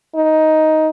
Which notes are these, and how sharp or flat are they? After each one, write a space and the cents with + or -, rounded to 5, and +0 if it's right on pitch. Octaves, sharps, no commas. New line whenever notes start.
D#4 +10